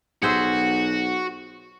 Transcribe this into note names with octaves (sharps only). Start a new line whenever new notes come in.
B1 F#4 G#4 C5 E5